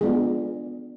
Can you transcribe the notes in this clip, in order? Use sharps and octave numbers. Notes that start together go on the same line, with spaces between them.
G#3 B3 D4 F4 G#4